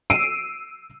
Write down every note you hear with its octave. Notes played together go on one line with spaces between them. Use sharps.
E6 C7 D7 D#7